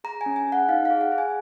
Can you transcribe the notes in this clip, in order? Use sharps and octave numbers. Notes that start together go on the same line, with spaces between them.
G#4 A#5
G#5
C#4
G#5
G#4 F#5
D#4 F5
F5
G#4
F#5
G#4
G#5